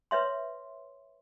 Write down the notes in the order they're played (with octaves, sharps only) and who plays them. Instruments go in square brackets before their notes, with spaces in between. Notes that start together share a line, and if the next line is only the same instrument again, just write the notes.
[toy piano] B4 C#5 E5 C6